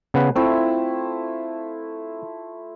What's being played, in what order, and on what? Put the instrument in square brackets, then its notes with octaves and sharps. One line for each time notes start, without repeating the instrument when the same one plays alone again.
[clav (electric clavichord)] C#3 B3 B4
[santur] A3 E4 F4 [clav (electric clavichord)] C4